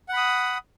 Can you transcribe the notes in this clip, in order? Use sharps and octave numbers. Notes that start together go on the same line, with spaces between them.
F#5 B5 D#6